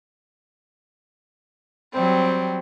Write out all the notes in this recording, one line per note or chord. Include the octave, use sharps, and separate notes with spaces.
F#3 G3 C4